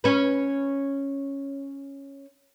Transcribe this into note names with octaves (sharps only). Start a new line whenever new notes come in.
C#4 B4